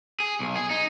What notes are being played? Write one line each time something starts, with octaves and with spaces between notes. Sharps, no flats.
G#4
B1
G#4
D#4